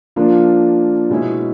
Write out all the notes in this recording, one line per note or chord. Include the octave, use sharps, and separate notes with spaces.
F3 A#3 D4 F4
B2 G#3 C#4 E4